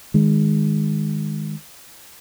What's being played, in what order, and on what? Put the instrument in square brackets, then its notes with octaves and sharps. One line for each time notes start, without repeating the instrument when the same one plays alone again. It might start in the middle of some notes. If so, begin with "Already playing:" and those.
[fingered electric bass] D#3 G#3